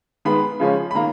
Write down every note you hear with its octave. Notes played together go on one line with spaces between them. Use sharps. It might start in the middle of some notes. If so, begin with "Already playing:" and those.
D#3 G#3 B3 B5
C#3 F3 G#3 C#4
B5
D#3 A#3 A#5